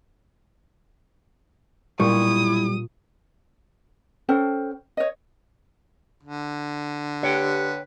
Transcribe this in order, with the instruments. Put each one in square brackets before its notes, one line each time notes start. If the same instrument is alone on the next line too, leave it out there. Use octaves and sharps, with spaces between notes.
[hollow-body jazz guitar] B1 G2 G3 [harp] A#2 C#6 [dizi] E4 [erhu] D#6
[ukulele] C#4 A4 C5 G5
C#5 D#5
[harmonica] D3
[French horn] G4 [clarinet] B4 [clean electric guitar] C#5 G5